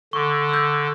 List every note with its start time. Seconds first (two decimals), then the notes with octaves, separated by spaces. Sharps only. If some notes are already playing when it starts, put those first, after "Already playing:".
0.13 D3 C#6 D6
0.49 E6 G6